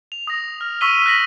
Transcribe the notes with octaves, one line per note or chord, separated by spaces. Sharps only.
F7
D#6 A#6
F6
C#6 D#6 E6 B6 D#7 G7
F#6 A#6 B6 F#7